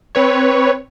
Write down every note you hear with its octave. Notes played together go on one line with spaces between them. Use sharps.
C4 B4 C#5